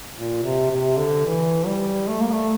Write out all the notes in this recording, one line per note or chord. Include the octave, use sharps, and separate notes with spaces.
A#2
C3
C3
D3
E3
G3
A3
A#3
A3